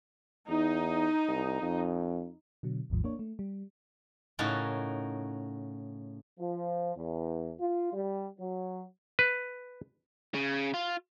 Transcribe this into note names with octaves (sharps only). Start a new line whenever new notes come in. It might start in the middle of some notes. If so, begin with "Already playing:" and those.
E2 D#4
C2
F2
B2 D3 F#3
G#1 D#2 G#2 F3
A#3 D4 C#5
A3
G3
A2 C#3 D#4 F#4 A#4 A5
F3
E2
F4
G3
F#3
B4
C#3
F4